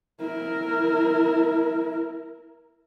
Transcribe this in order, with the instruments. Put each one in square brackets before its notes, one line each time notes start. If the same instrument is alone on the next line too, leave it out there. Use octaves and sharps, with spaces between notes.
[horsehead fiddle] E4 A#4